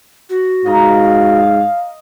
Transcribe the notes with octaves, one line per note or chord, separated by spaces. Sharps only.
F#4
G#2 D#5 F5 A#5